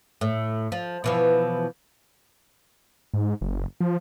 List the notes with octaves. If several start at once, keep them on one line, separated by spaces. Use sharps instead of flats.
A2
F3
B2 E3 F3
G#2
F#1
F3